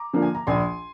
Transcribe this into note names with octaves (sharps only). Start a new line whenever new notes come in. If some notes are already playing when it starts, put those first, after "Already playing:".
Already playing: A#5 D6
D3 F3 A#3
G#5
A#5
A#1 G#5 C6